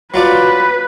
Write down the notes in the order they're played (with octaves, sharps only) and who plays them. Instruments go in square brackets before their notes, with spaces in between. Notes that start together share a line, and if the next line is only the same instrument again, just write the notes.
[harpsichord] F#3 F4 D5 [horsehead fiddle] B4